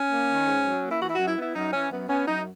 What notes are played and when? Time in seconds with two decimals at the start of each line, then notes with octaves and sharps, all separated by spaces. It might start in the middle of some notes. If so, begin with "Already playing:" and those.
Already playing: C#4
0.10 A#3
0.28 D#3
0.46 G#2
0.64 F#3
0.82 A#3
0.89 E4
1.00 E3 F#4
1.10 E4
1.14 F#2 F#4
1.28 E4
1.37 B3
1.42 E4
1.55 F#2 D#4
1.73 E3 C#4
1.92 F#2 B3
2.09 B3 C#4
2.27 F#2 D#4